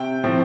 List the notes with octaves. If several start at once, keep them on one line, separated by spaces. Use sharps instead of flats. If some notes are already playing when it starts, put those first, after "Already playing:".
Already playing: C3 G5
A2 F3 C4